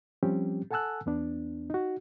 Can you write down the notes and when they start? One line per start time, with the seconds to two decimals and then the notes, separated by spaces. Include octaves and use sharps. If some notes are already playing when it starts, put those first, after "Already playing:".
0.23 F3 G3 C4 C#4 G4
0.71 A4 F#5 G#5 A5 E6 F#6
1.06 E2 B3 D4
1.70 D#4 F#4